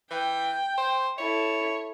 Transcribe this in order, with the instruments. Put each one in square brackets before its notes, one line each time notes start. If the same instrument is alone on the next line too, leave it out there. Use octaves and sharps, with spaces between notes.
[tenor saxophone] E3 [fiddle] G5
[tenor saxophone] C5
[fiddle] E4 A4 [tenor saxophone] C#5